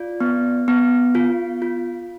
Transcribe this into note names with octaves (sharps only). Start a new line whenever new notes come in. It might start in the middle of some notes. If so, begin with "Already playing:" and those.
Already playing: F4 D5
B3
B3
F4
F4